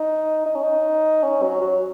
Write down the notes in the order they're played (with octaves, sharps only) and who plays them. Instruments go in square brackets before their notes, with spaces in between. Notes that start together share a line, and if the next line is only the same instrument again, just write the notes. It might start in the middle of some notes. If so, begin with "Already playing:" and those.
Already playing: [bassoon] D#4
D#4
C#4
D#4
C#4
F#3
F#3